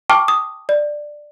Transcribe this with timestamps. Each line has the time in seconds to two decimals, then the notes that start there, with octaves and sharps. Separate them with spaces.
0.10 G5 A5 C#6 D6 F6
0.28 D#6
0.69 D5